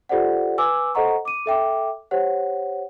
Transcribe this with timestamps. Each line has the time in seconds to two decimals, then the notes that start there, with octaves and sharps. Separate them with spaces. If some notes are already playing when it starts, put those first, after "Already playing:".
0.09 F4 G4 A4 C5 D5 F#5
0.58 B4 G#5 D6 E6
0.94 A4 C5 D#5 F#5 A#5 C#6
1.25 D6 D#7
1.46 A4 E5 G5 D6
2.11 G4 C5 C#5 F#5